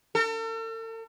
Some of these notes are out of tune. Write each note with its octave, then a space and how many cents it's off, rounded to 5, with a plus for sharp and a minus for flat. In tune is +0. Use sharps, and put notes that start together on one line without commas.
A4 +45